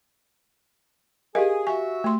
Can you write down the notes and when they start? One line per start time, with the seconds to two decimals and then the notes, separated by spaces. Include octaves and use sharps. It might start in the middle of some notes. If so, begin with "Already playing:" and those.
1.35 G4 G#4 A#4 D#5 F5 G#5
1.67 F#4 E5 G#5 C#6
2.04 A3 C6